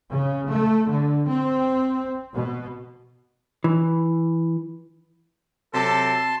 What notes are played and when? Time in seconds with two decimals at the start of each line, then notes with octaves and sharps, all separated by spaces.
0.11 C#3
0.50 A3
0.89 D3
1.29 C4
2.35 B2
3.64 E3
5.74 C3 F#3 A4 A5 C6